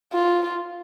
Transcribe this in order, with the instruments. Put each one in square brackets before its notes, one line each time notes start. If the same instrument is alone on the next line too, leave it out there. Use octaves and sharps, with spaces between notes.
[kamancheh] F4